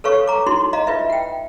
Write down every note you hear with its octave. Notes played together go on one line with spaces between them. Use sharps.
A4 B4 C#5 F5 C#6
A#5 D6
D#4 E4 F#4 C6
D#5 F5 A#5
F4 B4 E5
F#5 G5